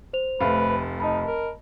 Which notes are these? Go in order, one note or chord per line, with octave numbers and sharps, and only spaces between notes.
C5 F7
F1 A3 B4 F5
D#4 D#5 A5 B5
A#4